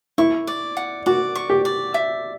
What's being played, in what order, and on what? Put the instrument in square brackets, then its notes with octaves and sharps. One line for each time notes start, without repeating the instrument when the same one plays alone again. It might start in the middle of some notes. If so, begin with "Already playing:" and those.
[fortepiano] E4 [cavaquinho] C#6
[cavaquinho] D5
F#5
[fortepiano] F#4 [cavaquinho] D5
[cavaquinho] C#6
[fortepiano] G4
[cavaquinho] D5
E5